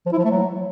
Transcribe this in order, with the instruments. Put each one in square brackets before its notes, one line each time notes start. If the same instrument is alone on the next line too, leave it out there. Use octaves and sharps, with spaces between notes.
[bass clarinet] F3
E4
F3
A3
F#3